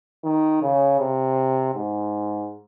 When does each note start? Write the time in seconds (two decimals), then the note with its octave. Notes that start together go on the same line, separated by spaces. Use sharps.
0.25 D#3
0.62 C#3
1.00 C3
1.74 G#2